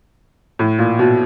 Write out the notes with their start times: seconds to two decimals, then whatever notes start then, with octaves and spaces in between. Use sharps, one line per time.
0.59 A2
0.78 A#2
0.99 B2